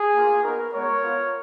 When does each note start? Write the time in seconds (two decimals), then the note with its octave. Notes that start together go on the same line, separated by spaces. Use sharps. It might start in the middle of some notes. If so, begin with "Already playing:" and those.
Already playing: G#4
0.14 A#3 F4
0.43 B3 D#4 F#4 A#4
0.72 G#3 B3 F#4 A#4 C#5
1.01 B3 F4